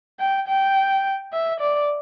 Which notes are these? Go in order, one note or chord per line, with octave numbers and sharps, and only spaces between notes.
G5
G5
E5
D5